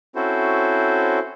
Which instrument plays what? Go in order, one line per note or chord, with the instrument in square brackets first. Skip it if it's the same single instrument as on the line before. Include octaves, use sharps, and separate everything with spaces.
[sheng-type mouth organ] C4 C#4 E4 F#4 A4 C5